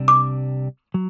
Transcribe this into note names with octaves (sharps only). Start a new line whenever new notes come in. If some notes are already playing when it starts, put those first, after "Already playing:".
Already playing: C2 C3 G3 D4
D6
F#3